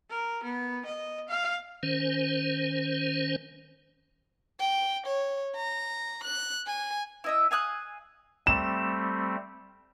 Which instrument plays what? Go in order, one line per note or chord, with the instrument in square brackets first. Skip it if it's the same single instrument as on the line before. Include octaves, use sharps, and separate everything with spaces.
[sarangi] A#4
B3
D#5
F5
[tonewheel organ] D#3 C#4 C5
[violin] G5
C#5
A#5
F#6
G#5
[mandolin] E4 D#5 E5
F5 G#5 D#6 F#6
[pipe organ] G3 A3 C4 [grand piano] E7